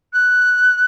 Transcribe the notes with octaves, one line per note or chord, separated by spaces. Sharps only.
F#6